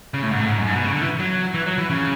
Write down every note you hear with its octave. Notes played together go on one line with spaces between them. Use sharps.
C#3
A2
G#2
A2
G#2
F#2
G#2
B2
C#3
D3
E3
F#3
E3
F#3
E3
C#3